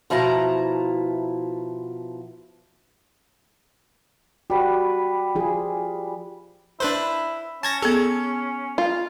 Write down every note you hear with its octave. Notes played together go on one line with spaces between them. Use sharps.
B2 F3 E4 A5 A#5
G3 F#4 B4
F3 F4 G#4
D4 E4 B4 C5
C#4 A5 G#6 A#6
B3 G#4 A4
F4